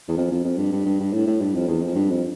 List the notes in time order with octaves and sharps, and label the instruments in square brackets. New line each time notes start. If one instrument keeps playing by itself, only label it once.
[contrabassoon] E2
F2
F2
F2
G2
G2
G2
G2
A2
A2
G2
F2
E2
F2
G2
F2